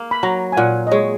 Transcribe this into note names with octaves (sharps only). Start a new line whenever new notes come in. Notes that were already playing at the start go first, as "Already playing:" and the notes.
Already playing: A#3
B5
F#3 A#5
G#5
A#2 F#5
D#5
G#3 C#5